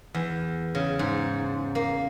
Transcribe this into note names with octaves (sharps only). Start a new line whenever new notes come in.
E2
C#3
G#2
A#3